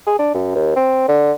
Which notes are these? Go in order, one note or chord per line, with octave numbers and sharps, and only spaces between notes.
G#4
D4
F#2
D#2
C4
D3